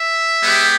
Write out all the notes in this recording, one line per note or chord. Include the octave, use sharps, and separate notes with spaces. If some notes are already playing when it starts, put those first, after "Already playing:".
Already playing: E5
G#3 B3 G4